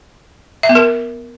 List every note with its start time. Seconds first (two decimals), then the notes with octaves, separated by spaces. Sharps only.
0.63 E5
0.69 B3
0.75 A#4